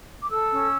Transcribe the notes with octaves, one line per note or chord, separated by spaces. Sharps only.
D6
A4 E6
C#4